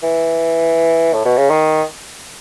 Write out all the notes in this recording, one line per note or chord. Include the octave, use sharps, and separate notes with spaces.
E3
A2
B2
C#3
D#3